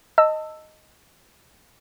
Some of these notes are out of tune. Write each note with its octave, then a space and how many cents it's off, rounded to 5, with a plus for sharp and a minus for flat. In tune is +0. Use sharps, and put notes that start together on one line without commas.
D#5 +0 A5 +25 E6 +0